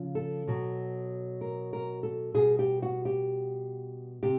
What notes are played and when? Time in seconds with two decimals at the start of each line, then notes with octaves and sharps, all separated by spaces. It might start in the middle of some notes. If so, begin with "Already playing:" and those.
Already playing: C#3 F3
0.15 A4
0.48 B2 F#3
1.41 A#4
1.73 A#4
2.03 A4
2.34 B2 G3 G#4
2.59 G4
2.82 F#4
3.05 G4
4.23 C3 G4